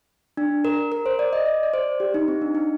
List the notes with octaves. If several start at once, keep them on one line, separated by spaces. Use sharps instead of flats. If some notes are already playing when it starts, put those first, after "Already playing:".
D4
A#4
A#4
C5
D5
D#5
D5
D5
C5
G4
D#4
C4
D4
D#4